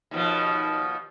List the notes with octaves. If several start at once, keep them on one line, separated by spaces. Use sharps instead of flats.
D#2 B2 F3